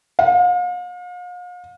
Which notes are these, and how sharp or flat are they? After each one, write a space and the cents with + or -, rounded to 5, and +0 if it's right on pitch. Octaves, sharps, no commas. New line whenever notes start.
F5 +40